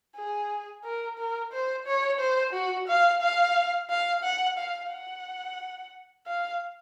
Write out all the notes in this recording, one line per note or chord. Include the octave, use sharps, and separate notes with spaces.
G#4
A#4
A#4
C5
C#5
C5
F#4
F5
F5
F5
F#5
F5
F#5
F5